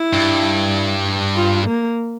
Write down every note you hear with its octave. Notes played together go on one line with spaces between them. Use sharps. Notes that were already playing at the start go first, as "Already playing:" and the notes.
Already playing: E4
G2
F4
A#3